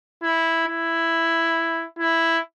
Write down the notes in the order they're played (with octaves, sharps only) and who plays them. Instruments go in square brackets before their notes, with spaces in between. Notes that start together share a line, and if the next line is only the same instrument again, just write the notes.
[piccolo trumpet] E4
E4
E4